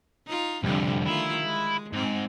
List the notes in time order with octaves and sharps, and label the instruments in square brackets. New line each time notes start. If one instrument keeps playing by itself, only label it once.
[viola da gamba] D#4 F4
[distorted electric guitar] C2 F2 [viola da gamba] D3 F3 G3
[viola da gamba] D#3 A3 F4 [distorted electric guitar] E4
[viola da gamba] G#3
[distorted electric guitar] G#2 [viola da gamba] C4